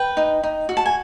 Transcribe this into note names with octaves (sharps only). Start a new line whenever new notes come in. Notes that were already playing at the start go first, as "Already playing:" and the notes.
Already playing: B4 G5
D#4
D#4
F#4
A5
G#5